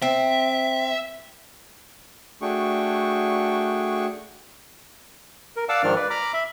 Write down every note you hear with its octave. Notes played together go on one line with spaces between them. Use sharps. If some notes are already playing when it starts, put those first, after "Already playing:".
C4 E5
A3 D4 F#4 G#4 G5 C#6
A#4
D5 F5 F#5 A5 D6 E6
G#2 D#3 F3 D4 F6
B4 D5
A#5 B5 D6 F6
E5 B5